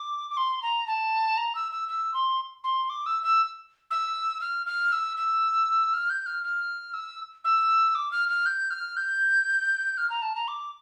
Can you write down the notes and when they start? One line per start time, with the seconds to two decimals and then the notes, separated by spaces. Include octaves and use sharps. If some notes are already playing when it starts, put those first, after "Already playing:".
Already playing: D6
0.30 D6
0.37 C6
0.62 A#5
0.87 A5
1.37 A#5
1.55 E6
1.71 E6
1.88 E6
2.13 C6
2.63 C6
2.89 D6
3.06 E6
3.23 E6
3.90 E6
4.41 F6
4.66 F6
4.92 E6
5.17 E6
5.93 F6
6.09 G6
6.26 F6
6.43 F6
6.93 E6
7.44 E6
7.94 D6
8.11 F6
8.28 F6
8.45 G6
8.70 F6
8.96 G6
9.97 F6
10.09 A#5
10.22 A5
10.35 A#5
10.47 D6